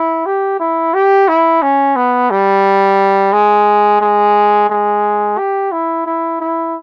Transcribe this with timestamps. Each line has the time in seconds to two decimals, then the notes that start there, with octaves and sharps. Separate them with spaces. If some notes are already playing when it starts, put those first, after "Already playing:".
Already playing: E4
0.26 G4
0.60 E4
0.94 G4
1.28 E4
1.62 C#4
1.96 B3
2.30 G3
3.33 G#3
4.01 G#3
4.69 G#3
5.38 G4
5.72 E4
6.06 E4
6.40 E4